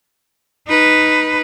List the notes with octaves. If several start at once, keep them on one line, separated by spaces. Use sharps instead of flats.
D#4 B4